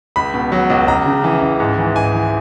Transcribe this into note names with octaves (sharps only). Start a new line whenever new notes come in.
C#2 B5
B2
F#3
C#2
C#2 A#5
C#3
E3
C#2
G#2
E3
G#2 G#5
E3